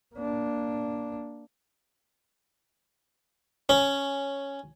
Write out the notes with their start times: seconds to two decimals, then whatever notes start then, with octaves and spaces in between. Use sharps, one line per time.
0.15 A#3 D4
3.69 C#4